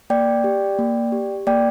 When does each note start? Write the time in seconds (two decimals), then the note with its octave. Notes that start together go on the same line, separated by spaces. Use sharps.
0.10 A#3 D5 G5
0.44 G4
0.79 A#3
1.12 G4
1.47 A#3 D5 G5